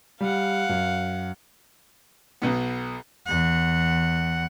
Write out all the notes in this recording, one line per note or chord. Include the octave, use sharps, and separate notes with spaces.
G3 F5 F#5
F#2
B1 B2 B3
E2 F#5